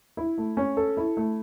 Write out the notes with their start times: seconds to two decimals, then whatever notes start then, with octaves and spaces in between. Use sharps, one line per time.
0.17 E4
0.38 A3
0.57 C#4
0.77 A4
0.97 E4
1.17 A3